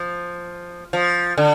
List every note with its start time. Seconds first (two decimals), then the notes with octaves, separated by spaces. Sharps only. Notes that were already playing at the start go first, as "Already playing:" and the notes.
Already playing: F3
0.93 F3
1.38 D3